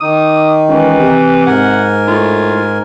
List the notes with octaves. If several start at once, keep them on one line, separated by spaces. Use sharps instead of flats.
D#3 D#4 D#6
C#2 E3
C3
G#2 A#4 F#5 G#5
A2 F4